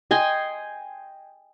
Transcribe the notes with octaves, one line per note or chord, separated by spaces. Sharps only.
D#5 G5 G#5 C6